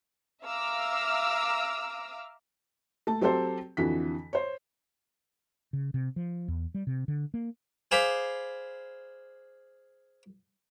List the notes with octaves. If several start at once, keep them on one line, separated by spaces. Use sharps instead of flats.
E5 F5 A#5 D6 E6 F6
A3 A5
F#3 C4 G4 A4 C5
F2 D3 E3 F#4 B6
C5 C#5
C#3
C3
F3
E2
G3
C3
D3
A#3
G#4 C5 D5 F5 B5